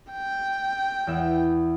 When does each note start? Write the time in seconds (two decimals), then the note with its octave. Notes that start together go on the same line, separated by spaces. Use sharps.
0.12 G5
1.07 E2 E5